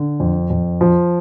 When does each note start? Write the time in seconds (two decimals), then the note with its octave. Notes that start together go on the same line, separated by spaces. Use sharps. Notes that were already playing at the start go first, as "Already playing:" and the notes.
Already playing: D3
0.20 F2
0.50 F2
0.81 F3